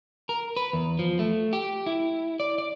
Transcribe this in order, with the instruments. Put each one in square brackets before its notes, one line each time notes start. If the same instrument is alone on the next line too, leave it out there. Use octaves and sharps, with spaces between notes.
[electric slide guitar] A#4
B4
E2
F3
A3
G4
E4
D5
D5